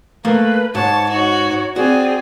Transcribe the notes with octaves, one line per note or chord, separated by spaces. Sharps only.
A3 A#3 B4
G#2 C#5 A5
D#4 F#4 C#5
C4 F#4 G#4 D5